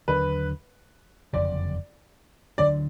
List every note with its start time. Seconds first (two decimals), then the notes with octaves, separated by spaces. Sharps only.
0.08 D#2 D3 F#3 D4 B4
1.33 F#1 F2 D3 D5
2.58 D2 D3 F#3 D4 D5